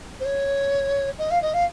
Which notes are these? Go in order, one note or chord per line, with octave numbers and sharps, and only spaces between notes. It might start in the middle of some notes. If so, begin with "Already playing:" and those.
C5
C#5
D#5
F5
D#5
F5